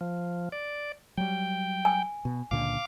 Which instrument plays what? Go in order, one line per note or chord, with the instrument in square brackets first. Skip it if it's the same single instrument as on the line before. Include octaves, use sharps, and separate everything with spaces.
[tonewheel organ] F3
D5
[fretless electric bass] F#3 G3 [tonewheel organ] G5
[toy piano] G#5
[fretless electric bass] B2
[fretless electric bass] C#2 A#2 D3 [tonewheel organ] F5 D6